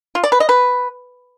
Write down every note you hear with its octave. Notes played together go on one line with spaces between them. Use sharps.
F4
D5
B4
D#5
B4